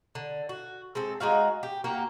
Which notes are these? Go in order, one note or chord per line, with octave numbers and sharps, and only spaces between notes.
D3
F#4
G#3 C4 A4
G#3 D#4 F#4 F5
G4
A#3 F#4 G4